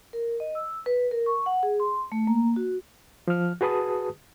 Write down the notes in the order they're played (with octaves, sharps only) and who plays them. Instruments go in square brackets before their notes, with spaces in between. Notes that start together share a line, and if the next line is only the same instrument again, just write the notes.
[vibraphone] A#4
D#5
E6
B4
A#4
C#6
F#5
G#4
C6
A3
A#3
F#4
[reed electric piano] F3 F6
F#4 G#4 B4 A5 D#6